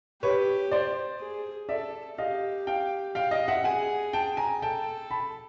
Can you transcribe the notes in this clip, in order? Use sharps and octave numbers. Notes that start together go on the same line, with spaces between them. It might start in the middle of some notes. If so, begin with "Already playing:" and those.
G4 B4 C#5
C5 D5
G#4
A4 D5 E5
G4 D#5 F5
F5 G5
F5 G5
D#5 F5
E5 F#5
G#4 F#5 G#5
G5 A5
G#5 A#5
A4 G5 A5
A5 B5